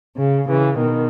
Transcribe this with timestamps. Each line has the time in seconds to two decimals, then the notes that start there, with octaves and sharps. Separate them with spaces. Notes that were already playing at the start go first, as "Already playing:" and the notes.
0.17 C#3
0.48 C#3 E3
0.79 B2 D#3